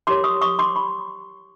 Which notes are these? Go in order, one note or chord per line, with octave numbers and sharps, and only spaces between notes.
E4 G4 A#4 C#5 C6 D6
C#6 D#6
C#6 D#6
C6 D6
B5 C#6